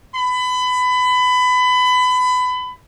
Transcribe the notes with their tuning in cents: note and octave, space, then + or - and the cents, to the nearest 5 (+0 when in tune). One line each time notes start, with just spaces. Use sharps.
B5 +25